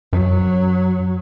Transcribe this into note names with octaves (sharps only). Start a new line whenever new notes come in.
F#2 F#3